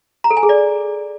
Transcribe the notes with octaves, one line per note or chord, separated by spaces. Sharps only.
A#5
A4
G#5
G#4
D5